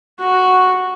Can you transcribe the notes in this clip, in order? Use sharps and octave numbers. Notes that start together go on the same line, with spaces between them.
F#4